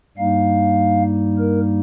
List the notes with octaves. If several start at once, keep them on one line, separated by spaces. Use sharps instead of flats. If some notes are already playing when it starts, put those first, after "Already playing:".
G2 G3 A#3 D#4 F5
A#4